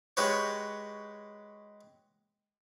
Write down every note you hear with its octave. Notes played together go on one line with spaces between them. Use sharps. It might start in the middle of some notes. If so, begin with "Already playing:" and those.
G#3 F#4 G4 B4 C#5